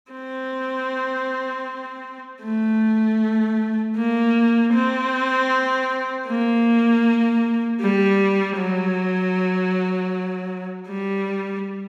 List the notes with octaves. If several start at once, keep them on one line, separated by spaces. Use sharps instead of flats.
C4
A3
A#3
C4
A#3
G3
F#3
G3